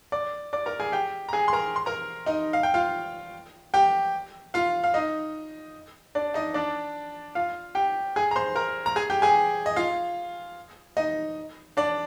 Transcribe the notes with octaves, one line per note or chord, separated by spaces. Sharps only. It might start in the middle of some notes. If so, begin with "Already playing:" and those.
D5 D6
D5 D6
A#4 A#5
G#4 G#5
G4 G5
A#5
G#4 G#5
C6
A#4 A#5
C6
A#4 A#5
D#4 D#5
F5
G5
F4 F5
G4 G5
F4 F5
F5
D#4 D#5
D4 D5
D#4 D#5
D4 D5
F4 F5
G4 G5
G#4 G#5
A#5
C5 C6
A#4 A#5
A#5
G#4 G#5
G4 G5
G#4 G#5
D#5
F4 F5
D#4 D#5
D4 D5